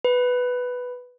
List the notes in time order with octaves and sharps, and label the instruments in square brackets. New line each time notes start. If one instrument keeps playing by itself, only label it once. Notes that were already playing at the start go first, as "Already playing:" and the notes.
[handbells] B4